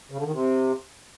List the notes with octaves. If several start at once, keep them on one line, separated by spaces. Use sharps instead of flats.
C#3
D3
D#3
C3